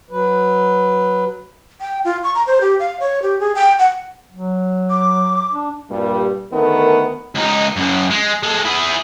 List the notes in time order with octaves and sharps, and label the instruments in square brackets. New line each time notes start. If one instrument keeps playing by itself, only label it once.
[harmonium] F#3 B4
[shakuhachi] G5
F4
C#6
A#5
C5
G4
F5
C#5
G4
G#4
G5
F#5
[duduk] F#3
[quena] D6
[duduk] D4
[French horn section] G2 A#2 G3
D2 D#3 A3 B3 A#4
[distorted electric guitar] C#2 D#4
F#2 C#3
G#3
G#3 A4
E4 G#4